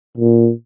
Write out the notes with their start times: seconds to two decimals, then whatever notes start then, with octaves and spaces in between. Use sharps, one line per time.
0.17 A#2